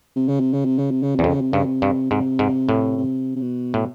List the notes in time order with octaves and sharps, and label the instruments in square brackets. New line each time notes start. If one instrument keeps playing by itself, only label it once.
[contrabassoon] C3
C#3
C3
C#3
C3
C#3
C3
C#3
[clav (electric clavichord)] E2 [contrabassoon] C3
[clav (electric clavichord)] F2
[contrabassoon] C#3
C3
[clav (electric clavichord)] G2 [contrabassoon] C#3
[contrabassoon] C3
[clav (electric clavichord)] G2
[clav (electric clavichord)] G#2 [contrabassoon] C3
[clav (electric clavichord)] G#2
A2
[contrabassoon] C3
C3
B2
[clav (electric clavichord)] A2